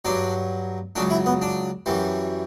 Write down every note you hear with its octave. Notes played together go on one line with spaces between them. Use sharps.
G2 F#3 D4
C#2 C#3 F#3 D4
E4
B3
D4
F#2 E3 G3